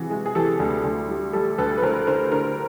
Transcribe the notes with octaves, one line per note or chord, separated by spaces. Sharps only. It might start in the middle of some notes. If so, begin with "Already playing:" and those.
Already playing: C3 E3 F#4 G#4
G#3
G#4
E3 G4 A4
D2
D2
G3
G3 G4 A4
D2 A4 B4
B4
D2 A#4 C5
D3 A#4 C5
D3 A#4 C5